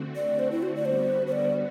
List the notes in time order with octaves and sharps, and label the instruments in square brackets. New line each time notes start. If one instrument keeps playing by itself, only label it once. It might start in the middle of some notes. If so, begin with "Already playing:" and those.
Already playing: [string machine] D3 A3 C4 F#4
[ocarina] D5
C5
E4
F#4
D5
[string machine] D3 G3 B3 F#4 [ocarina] C5
[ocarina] C5
D5